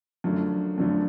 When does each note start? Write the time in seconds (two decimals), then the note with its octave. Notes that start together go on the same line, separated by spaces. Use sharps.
0.24 F#2 D3 F3 A3
0.78 F#2 D3 F3 A3